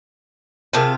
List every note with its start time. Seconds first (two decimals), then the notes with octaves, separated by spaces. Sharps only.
0.73 C3 F4 G#4 A#4 A5